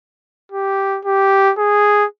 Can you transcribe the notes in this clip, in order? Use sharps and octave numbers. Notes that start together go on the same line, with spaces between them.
G4
G4
G#4